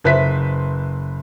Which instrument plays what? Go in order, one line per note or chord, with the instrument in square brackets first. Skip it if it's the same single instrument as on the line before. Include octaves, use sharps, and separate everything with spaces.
[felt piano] F#1 B4 C5 E5 B6